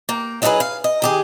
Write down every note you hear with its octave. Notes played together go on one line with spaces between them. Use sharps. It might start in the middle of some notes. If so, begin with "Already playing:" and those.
A#3 G5
F#3 D#4 F4 F#4 G#4 B4
F5
D#5
D#3 G4 G#4